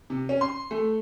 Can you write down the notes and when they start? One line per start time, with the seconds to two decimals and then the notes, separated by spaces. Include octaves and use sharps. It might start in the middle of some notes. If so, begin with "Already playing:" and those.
0.10 C3
0.29 C#4
0.41 C6
0.71 A3